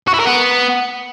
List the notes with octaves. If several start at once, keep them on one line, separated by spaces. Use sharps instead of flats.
F#4
E4
A#4
B3